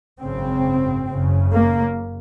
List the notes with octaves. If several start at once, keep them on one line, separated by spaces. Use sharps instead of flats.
G#1 F#2 C#3 C4
F#1 F#2 C#3
A#3